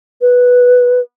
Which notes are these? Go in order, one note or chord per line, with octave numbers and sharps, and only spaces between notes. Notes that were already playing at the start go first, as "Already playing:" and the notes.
B4